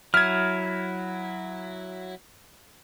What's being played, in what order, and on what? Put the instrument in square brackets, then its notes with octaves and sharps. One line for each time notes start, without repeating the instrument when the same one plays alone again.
[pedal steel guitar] F#3 E4 [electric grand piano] F6 G#6